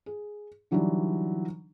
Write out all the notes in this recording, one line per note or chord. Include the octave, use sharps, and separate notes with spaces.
G#4
D3 E3 F#3 G3 D4 D#4